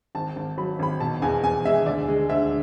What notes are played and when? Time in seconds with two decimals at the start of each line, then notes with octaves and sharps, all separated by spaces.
0.15 G#1 A5
0.36 G#1
0.57 F#3 B5
0.79 G#1 B5
1.00 B2 A5
1.22 E2 G#5
1.44 E2 G#5
1.65 G#3 E5
1.86 D2 D5
2.08 G#3
2.29 D2 E5